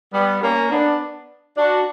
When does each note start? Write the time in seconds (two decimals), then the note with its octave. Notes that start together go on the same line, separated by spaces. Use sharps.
0.13 G3 B3
0.43 A#3 C#4
0.71 B3 D4
1.57 D4 F#4